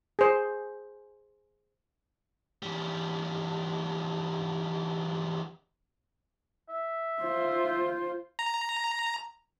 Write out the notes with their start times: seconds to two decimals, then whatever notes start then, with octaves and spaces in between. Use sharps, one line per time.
0.19 G#4 C5
2.63 E2 G3
6.69 E5
7.23 F4 C5
8.39 A#5